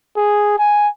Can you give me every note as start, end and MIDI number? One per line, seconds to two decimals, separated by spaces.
0.17 0.54 68
0.59 0.88 80